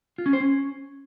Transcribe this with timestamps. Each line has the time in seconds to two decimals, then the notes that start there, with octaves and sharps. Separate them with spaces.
0.18 F4
0.26 C#4
0.33 C5
0.40 C#4